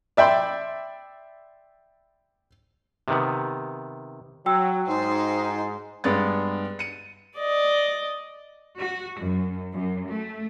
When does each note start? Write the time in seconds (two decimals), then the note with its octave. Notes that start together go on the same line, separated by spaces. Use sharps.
0.17 D5 E5 G5 B5 C6
3.08 C3 D#3 B3
4.46 F#3 F#4 G5 E6
4.88 G#2 D#4 C5
6.04 G2 G#3 B3 A6
6.79 C#7 D#7
7.39 D5 D#5
8.77 F#4
9.18 F#2
9.72 F#2
10.09 A3